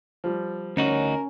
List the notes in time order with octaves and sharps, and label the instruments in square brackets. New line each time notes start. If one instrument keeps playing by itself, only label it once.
[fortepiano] F3 G3
[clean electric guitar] D2 D#4 F#4 [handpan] C#4 [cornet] A#4